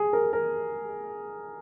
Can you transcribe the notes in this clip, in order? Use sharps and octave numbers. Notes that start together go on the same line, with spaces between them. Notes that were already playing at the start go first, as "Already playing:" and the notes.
Already playing: G#4
A#4
A#4